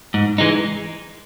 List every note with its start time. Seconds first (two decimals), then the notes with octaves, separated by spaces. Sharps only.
0.14 G#2
0.38 E3 G#3 D#4